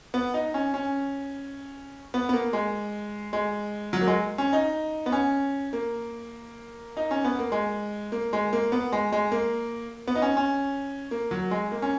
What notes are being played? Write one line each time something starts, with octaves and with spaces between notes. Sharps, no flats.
B3
D#4
C#4
C#4
B3
B3
A#3
G#3
G#3
F#3
A#3
G#3
C#4
D#4
B3
C#4
A#3
D#4
C#4
B3
A#3
G#3
A#3
G#3
A#3
B3
G#3
G#3
A#3
B3
D#4
C#4
C#4
A#3
F#3
G#3
A#3
C#4